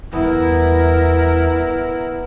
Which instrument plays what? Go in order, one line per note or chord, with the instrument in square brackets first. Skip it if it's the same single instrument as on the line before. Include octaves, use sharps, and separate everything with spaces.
[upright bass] E2 G3 [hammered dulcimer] B3 [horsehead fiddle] E4 A#4